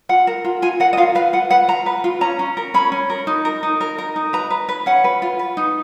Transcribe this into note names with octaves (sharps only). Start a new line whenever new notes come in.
F4 F#5
A#4
F4
F4 G#5
A#4 F#5
D#5
F4 F5
B4 F5
F4 F#5
B4 F#5
F4 A#5
B4
F4
C#4 A#5
C#4
A#4
C#4 B5
C#4
A#4
D#4
A#4
D#4
A#4
A#4
D#4
B4 A#5
B4
B4
C#4 F#5
B4
F4
B4
D#4